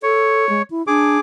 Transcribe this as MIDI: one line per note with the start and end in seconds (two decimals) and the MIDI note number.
0.03 0.48 69
0.03 0.62 73
0.49 0.62 56
0.70 0.86 64
0.87 1.18 62
0.87 1.20 68
0.87 1.20 86